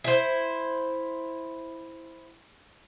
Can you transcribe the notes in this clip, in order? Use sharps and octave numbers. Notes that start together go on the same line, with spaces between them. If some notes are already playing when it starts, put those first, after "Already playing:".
E4 C5